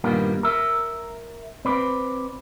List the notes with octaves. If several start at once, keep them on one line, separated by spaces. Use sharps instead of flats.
G2 A#2 D#3 G3 A#3 B3
A#4 E5
C4 B4 D5